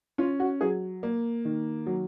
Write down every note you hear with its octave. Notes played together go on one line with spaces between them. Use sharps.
C#4 F4
F#4
F#3 G#4
A#3
D#3
F#3